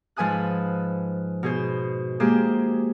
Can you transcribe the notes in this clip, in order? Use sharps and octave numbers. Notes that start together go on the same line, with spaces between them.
G#2 F3 B4 G#5 D#6 F#6
B2 G#4 C5
G#3 A#3 G4 G#4 C5